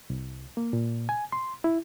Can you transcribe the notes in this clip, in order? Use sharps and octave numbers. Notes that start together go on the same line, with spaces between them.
C2
A#3
A#2
G#5
C6
E4